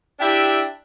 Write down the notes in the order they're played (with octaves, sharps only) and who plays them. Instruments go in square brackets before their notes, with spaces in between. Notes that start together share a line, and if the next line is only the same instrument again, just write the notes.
[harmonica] D4 [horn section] E4 G4 E5 [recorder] G5